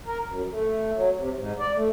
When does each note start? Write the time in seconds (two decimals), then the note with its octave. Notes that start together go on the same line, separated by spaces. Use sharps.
0.06 A#4
0.25 F#2
0.50 A3
0.95 F#3
1.17 C3
1.37 G#2
1.59 D5
1.75 A3